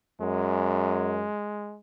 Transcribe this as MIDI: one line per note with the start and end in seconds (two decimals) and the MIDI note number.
0.21 1.27 42
0.21 1.79 56